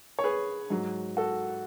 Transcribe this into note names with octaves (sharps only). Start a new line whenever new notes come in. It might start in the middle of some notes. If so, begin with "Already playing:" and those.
C#5
G#4 B4
G#2 F#3
F#4 A4